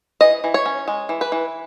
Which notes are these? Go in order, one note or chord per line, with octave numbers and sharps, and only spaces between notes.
E3 D#5
E3
C#5
C#4
G#3
E3
B4
E3